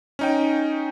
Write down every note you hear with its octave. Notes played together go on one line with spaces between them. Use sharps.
C#4 D#4 G5